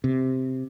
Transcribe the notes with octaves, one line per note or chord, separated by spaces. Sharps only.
C3